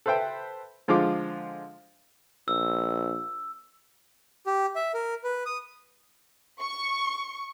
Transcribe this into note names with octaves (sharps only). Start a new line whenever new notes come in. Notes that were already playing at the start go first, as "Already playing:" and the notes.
A4 B4 C5 E5 G5
D3 F3 G#3 F4 D6
A#1 E6
G4
E5
A#4
B4
D#6
C#6